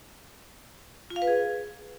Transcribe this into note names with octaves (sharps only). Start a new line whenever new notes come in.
F4
F5
B4
G#4